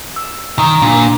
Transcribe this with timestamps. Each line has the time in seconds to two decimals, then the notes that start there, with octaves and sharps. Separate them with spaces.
0.16 E6
0.59 D#3 A#5
0.82 A#2 D4